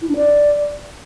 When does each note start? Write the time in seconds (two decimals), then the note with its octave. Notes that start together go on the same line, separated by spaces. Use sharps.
0.02 E4
0.09 D4
0.16 D5